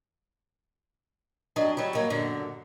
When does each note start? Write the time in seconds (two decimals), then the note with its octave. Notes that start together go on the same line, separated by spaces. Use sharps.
1.56 F2 F#3 D4 D#5
1.77 F#3 G3
1.95 F#3 A#3 D#5
2.10 F#2 A#2 D3